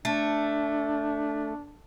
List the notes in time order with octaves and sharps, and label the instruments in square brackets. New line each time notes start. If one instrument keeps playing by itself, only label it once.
[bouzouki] A3 [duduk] D4